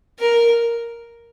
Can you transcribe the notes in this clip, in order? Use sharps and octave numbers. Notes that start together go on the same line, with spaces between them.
A#4